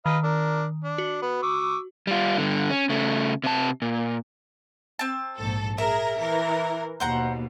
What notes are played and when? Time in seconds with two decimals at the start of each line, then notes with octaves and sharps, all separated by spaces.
0.06 D#3 B4 D#5 F5
0.24 D4 A#4
0.85 D4
0.98 F#4
1.22 B3
1.43 C#6 D6 E6
2.07 G3 F4
2.38 G2 D3
2.70 C#4
2.89 C#3 A3
3.44 C3 A5
3.82 A#2
4.99 C4 A5
5.39 A#1 G#2 A4
5.78 G#4 A#4 E5
6.20 E3 A#4
7.00 D#2 B2 C5 F#5 A#5